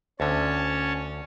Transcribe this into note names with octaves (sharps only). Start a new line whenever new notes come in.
D2 D3 C#4 C#5 A5